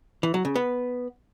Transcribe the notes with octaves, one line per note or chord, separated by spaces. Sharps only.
E3
F#3
C#3
B3